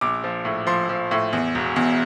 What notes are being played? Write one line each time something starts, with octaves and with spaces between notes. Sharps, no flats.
A#1 D6
F3
A2
F3 C6
F3
A2
E2
E1
E2